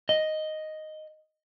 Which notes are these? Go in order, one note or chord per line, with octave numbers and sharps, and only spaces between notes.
D#5